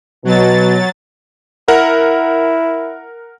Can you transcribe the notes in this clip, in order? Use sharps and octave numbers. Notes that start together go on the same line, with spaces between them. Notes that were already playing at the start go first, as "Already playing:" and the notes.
B2 F#3 A6
E4 A#4 F#5